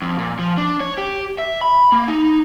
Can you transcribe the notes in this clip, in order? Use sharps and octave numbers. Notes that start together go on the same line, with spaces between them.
F2
A#2
F3
D4
C#5
G4
E5
B5
A#3
D#4